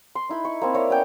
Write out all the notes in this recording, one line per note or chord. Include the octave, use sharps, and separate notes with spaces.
C6
D#4 E4 B5
C#6
A#3 C4 E4
E4 A#4 C#5 D5
B3 C#4 G5